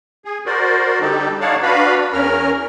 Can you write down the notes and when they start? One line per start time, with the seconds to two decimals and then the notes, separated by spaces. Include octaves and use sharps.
0.25 G#4
0.46 F#4 A#4 C5 D5
1.01 D3 G3 D#4 G4 A4
1.41 D#4 C#5 D5 F5 F#5 A5
1.62 D4 F#4 B4 F5 B5
2.13 E2 C#4 A#4 F6